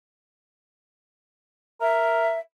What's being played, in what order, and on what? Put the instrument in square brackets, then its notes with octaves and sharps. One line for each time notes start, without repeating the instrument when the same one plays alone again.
[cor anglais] A#4 [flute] E5